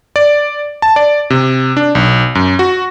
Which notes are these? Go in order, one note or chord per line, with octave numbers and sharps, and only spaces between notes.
D5
A5
D5
C3
D4
B1
F#2
F#4